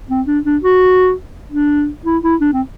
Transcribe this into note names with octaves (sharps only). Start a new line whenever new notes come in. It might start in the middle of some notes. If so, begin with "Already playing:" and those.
C4
D4
D4
F#4
D4
E4
E4
D4
C4